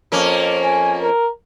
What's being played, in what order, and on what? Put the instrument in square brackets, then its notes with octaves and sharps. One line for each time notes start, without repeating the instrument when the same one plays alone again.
[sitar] F2 A#3 C#4
[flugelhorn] G#5
A#4